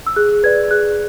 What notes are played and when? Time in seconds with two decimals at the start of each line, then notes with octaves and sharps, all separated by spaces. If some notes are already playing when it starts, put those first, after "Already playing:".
0.07 E6
0.16 G#4 F#6
0.43 B4 D5 G#6
0.71 G#4 F#6